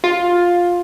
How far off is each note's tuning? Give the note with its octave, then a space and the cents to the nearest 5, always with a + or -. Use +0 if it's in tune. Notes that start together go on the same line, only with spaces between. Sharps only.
F4 +10